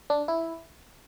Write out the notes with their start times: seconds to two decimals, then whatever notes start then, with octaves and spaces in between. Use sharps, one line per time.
0.10 D4
0.28 E4